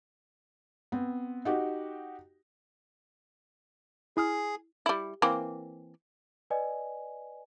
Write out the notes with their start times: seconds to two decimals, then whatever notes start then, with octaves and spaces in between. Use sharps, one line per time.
0.92 B3 C4
1.45 D#4 F#4 G4
4.17 E4 G#4 D#6 F6
4.86 G3 E4
5.22 E3 A#3 C4
6.50 B4 D5 D#5 G#5